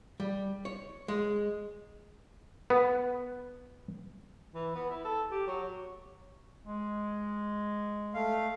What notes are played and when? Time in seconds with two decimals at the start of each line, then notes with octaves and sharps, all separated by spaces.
0.20 G3
0.65 C#5
1.08 G#3
2.70 B3
4.54 E3
4.75 B3
4.90 E4
5.05 A4
5.31 G4
5.47 F#3
6.66 G#3
8.14 A3 F5